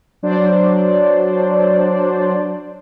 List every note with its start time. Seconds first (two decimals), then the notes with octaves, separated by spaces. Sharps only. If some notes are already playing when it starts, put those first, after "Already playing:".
0.23 F#3 D4 C5 D5